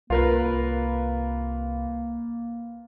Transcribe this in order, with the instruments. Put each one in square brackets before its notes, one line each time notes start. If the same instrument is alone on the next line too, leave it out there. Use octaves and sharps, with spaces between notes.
[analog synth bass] C2 [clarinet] A#3 [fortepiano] F4 A#4 B4